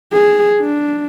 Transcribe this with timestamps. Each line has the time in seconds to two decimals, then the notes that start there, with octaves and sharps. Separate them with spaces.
0.13 G#4
0.59 D4